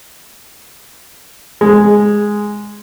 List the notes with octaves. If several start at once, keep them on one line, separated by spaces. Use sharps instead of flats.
G#3